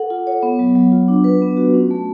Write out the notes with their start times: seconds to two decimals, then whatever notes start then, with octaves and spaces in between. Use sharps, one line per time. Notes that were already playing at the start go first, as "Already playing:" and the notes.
Already playing: A4 F#5
0.10 F4
0.27 C#5
0.43 B3
0.59 F#3
0.76 F#3
0.92 F4
1.08 D4
1.24 B4
1.42 B3
1.57 F#4
1.74 C#4
1.91 A3